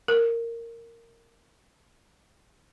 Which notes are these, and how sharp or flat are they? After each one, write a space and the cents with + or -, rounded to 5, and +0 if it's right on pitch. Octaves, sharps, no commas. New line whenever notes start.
A#4 -10